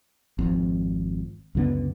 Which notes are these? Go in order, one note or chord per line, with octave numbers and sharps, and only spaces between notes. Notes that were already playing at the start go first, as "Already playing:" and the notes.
G#1 F2
C#2 F#2 D3 B3